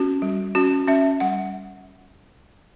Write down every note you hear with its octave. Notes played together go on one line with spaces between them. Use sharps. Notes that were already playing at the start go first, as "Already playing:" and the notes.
Already playing: C#4 F#4
G3
C#4 F#4
C#4 E5
G3 F#5